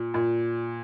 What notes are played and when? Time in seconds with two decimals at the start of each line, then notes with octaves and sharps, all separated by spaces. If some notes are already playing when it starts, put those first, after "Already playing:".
Already playing: A#2
0.14 A#2